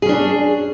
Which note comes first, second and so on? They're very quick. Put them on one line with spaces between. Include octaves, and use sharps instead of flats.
G#4 C#4 D4